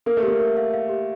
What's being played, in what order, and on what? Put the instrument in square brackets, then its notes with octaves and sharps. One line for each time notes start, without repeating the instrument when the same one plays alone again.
[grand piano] A#3 [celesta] A#4
[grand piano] A3
[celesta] G4
[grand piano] A#3
[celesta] A#4
F5
F5
G4